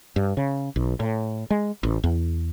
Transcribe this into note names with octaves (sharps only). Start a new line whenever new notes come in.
G2
C#3
B1
A2
G#3
A1
E2